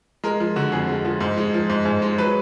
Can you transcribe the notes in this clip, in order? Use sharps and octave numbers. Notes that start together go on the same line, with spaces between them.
G#3 A#4
F3
D3 F#4
F2 G#4
G#3
F3
G#2
G#3
F3
G#2
G#2
G#3
F#3 B4